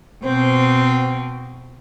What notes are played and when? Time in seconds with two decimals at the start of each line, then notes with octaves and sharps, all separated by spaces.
0.23 B2 C4